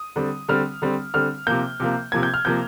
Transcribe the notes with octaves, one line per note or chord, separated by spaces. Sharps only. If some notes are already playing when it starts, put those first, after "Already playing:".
Already playing: D#6
D3 G3 C4
D3 G3 C4 F6
D3 G3 C4
D3 G3 C4 F6
C3 F3 A#3 G6
C3 F3 A#3
C3 F3 A#3 G#6
G6
F6
C3 F3 A#3 G6